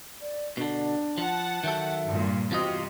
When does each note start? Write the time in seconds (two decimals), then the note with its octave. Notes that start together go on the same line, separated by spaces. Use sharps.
0.21 D5
0.57 B2 D3 D4
1.18 F3 F#5 A5
1.64 D#3 F#3 A4 E5
2.07 G2 A#2
2.51 E2 C3 F4 F#4 D#5